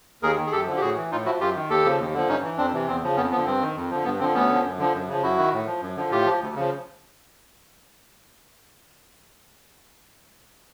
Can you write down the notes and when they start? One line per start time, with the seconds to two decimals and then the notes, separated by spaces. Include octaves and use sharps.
0.22 D#2 G#4 A#4
0.37 D#3
0.47 G#4
0.52 F#2 G4 A4
0.66 D3 F3
0.77 G4
0.81 A2 F#4 G#4
0.96 E3
1.12 A2 D#4 F4
1.25 F3 E4 F#4
1.40 F#2 F4 G4
1.55 D#3
1.69 D#2 G4 A4
1.85 C#3 F3
2.00 D#2
2.14 D3 F3
2.29 G2 C#4 D#4
2.43 E3
2.58 F2 C4 D4
2.73 C3 E3
2.87 E2 C4
3.03 C#3 F3
3.16 F2 B3 C#4
3.31 F3 B3
3.37 D3
3.46 G2 C4
3.61 D#3
3.76 F2
3.90 D3 F3
4.05 G2 B3
4.20 D3 F3 C4
4.34 D2 B3 C#4
4.49 D3
4.54 F3
4.64 F#2
4.78 D3 F3
4.94 F#2
5.08 C#3 F3
5.22 F#2 E4 F#4
5.38 D#3
5.53 A2
5.66 F3
5.81 F#2
5.96 D3 F3
6.11 A2 F4 G4
6.25 F3
6.41 D2
6.56 C#3 F3